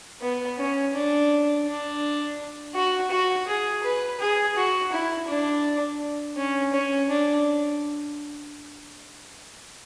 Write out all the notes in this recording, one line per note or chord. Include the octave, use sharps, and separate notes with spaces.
B3
C#4
D4
D4
F#4
F#4
G#4
B4
G#4
F#4
E4
D4
C#4
C#4
D4